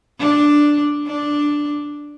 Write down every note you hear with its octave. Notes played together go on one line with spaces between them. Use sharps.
D4
D4